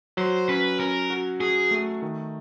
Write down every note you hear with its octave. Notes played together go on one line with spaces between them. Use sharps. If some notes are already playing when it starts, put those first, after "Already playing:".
F#3 C5
C#4 B4
C#4 A#4
F#4
F#4 G#4
A3
D#3